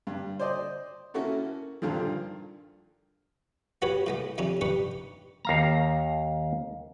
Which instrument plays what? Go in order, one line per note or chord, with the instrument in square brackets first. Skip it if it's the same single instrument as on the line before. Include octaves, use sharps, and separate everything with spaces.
[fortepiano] G2
C5 D5 D#5
A#3 C#4 E4 F#4 A4 A#4
G2 A#2 D3 D#3 F3
[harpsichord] B3 F#4 G4 B4 C#5
A2 G#3 B3
F2 C3 C#4 D4
D4 D#4 G4 B4 C#6
[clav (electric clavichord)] D#2 F5 A#5